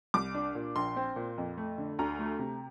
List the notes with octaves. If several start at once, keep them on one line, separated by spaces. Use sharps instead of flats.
C2 D6
D4
A#2
A#1 C6
C4
A#2
F2
A3
D3
D2 A#5
A3
C3